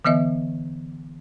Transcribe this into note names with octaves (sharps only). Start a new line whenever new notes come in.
D3 E3 B3 D#5 E5